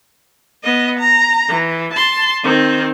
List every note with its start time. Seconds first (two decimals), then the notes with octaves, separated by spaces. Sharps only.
0.63 B3 D#5
0.99 A#5
1.49 E3
1.93 A5 C6
2.44 D#3 C4